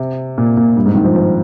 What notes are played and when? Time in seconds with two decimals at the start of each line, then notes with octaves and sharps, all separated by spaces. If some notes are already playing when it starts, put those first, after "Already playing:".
Already playing: C3
0.38 A#2
0.57 A#2
0.76 G2
0.86 G#2
0.95 D#3
1.04 F3
1.15 F3